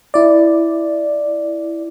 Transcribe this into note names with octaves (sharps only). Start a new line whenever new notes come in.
E4 D5